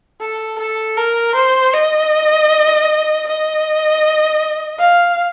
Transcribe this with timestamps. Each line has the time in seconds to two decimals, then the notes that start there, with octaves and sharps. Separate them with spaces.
0.21 A4
0.59 A4
0.97 A#4
1.35 C5
1.73 D#5
3.27 D#5
4.79 F5